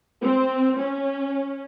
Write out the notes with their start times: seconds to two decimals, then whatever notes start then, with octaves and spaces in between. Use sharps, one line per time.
0.21 C4
0.77 C#4